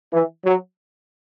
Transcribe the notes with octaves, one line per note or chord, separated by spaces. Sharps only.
E3
F#3